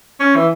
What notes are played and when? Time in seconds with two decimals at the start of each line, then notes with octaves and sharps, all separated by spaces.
0.19 C#4
0.35 E3